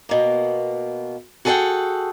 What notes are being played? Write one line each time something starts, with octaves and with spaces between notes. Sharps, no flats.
B2 A#3
F#4 G#4 A4 B4 F#5 G5